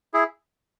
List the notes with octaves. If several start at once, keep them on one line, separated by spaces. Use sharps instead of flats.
E4 G#4